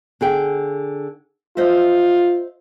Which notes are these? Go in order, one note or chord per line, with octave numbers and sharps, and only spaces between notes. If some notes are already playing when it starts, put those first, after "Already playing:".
D3 G#4 G5
F4 C5 D#5 E5